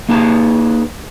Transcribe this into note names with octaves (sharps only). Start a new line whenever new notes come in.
A#3 D#4 G#4 B4 A5 A#5